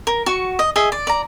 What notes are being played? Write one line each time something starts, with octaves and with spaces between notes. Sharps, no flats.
A#4
F#4 C#6
D#5
G#4 D#5 E5
D5
D5 A#5